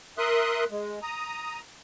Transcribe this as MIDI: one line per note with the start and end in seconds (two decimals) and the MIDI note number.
0.18 0.64 70
0.18 0.64 76
0.18 0.64 84
0.18 0.64 87
0.18 0.64 90
0.71 0.99 56
1.03 1.59 82
1.03 1.59 87